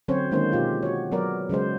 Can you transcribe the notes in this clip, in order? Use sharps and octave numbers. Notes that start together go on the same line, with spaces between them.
D3 F#3 C4 C#4 C5 C#5
D#3 G#3 A#3 C#4 C5
B2 F4 G4
F#4 C#5
F#3 B3 A#4 D5
C#3 F#3 G#3 C5